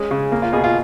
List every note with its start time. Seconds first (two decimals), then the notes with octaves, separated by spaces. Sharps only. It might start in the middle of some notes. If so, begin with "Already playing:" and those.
Already playing: G#3 C#4
0.11 C#3
0.32 A#3
0.42 F4
0.53 B2 G#4
0.64 F4